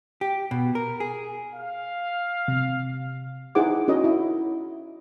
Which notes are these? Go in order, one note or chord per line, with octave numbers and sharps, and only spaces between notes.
G4
B2
A#4
G#4
F5
C3
D#4 E4 G#4 C5 F#5 D6
C#4 F#4 A#4 C#5 D#5
E4